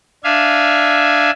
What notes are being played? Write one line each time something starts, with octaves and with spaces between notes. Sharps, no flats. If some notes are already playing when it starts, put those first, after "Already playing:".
D4 E5 F5 G#5